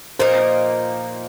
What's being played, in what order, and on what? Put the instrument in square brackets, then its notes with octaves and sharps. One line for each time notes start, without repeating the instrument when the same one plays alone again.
[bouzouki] A#2 F3 A#3 D#4 [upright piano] C5